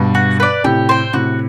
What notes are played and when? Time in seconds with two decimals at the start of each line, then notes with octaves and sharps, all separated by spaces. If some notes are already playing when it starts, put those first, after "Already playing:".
Already playing: G2 B2
0.15 F#4
0.40 B4 D5
0.64 A2 C3 G4
0.89 C5 G5
1.13 A2 C3 F#4